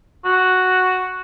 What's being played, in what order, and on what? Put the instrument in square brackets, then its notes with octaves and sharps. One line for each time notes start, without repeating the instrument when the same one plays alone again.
[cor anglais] F#4